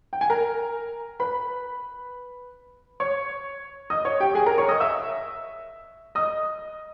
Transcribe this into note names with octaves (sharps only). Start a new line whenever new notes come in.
G5
G#5
A#4 A#5
B4 B5
C#5 C#6
D#5 D#6
C#5 C#6
G4 G5
G#4 G#5
A#4 A#5
C#5 C#6
D#5 D#6
E5 E6
D#5 D#6